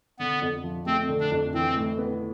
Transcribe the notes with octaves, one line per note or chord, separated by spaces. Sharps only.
D3 B3
F2
F3
A3 C4
D3
D4
F2
E3 C4
A2
B3